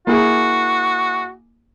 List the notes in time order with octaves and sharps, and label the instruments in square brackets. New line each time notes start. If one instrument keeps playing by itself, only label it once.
[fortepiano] A#3 E4 G#4 [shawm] F#4